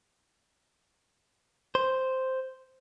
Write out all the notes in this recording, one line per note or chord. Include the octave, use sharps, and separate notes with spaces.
C5